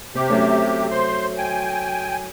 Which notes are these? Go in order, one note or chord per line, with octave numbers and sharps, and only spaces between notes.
C3 C4 G4
F#3 A3 C#4
C5 C6
G5 G#5